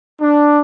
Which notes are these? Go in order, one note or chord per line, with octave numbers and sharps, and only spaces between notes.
D4